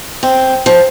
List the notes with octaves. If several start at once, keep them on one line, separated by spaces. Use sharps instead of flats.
C4
F3